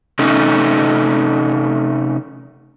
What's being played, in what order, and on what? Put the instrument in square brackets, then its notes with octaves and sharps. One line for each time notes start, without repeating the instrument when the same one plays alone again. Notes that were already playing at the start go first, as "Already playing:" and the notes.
[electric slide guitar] C3 A3 C#4 D#4